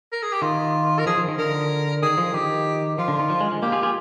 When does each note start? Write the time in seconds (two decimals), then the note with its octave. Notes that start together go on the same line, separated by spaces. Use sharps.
0.12 A#4
0.22 G#4
0.32 G4
0.42 D#3 F4
0.98 A#4
1.06 F3 G#4
1.17 F3
1.28 D#3
1.38 D3 A#4
2.02 D#3 G#4
2.18 F3
2.34 D#3 G4
2.98 F3 F4
3.08 D3
3.19 D#3
3.30 F3
3.41 G#3
3.51 G#3
3.62 A#3 G4
3.72 F4 G#4
3.83 F4 G#4